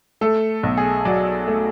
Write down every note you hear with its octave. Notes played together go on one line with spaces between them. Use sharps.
A3 A4
B1
G#4
F#3 D5
A3